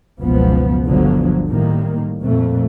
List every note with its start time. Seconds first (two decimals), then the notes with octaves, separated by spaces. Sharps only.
0.22 F#1 C#2 B2 F3 B3
0.85 G1 D2 D3 F3 F#3
1.49 A2 D#3 G3 A#3
2.23 F2 A#2 A3